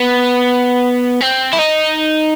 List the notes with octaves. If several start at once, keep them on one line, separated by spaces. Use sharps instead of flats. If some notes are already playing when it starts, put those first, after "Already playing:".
Already playing: B3
C4
E4
D#4